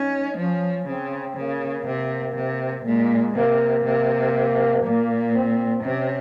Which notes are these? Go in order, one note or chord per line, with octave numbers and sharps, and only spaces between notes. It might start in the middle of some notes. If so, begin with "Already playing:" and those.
Already playing: C#4 D#4
F3 C#4
C#3 C4
C#3 A#3
C3
C3
A#2 G#3
C3 A#3
C3 A#3
A#2 A#3
C4
C3 C#4